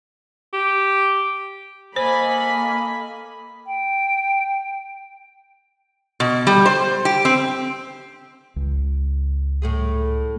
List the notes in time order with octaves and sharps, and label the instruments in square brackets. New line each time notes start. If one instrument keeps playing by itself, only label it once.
[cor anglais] G4
[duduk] A#3 [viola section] A4 D#5 B5 [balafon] C5 [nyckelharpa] G#5
[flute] G5
[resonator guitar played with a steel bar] B2
G3
C5
G4
C4
[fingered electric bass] C#2
[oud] A2 A3 G#4